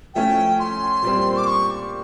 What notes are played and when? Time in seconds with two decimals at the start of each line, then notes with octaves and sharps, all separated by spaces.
0.15 F3 A3 C#4 E4 G5
0.59 C6
1.02 A#2 G3 C4
1.37 D6
1.47 C#6